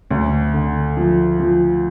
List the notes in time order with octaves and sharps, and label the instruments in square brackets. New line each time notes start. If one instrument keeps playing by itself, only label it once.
[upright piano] D2
D3
F3
F3